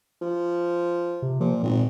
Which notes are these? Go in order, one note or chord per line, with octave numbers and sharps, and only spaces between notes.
F3
C3
A#2 F3
G#1 A#2